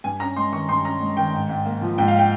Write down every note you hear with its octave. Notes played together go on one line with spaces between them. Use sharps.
G2 G#5
C#4 A#5
G#3 C6
D#3 C#6
G2 C6
C#4 A#5
G#3
D#3 G5
G#2
G#2
A#3
F3
G#2 G5
F5
G5